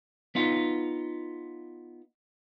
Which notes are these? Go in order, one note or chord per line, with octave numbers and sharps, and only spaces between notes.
B3 D#4 F4